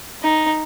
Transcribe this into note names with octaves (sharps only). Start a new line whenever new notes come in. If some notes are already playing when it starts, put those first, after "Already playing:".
D#4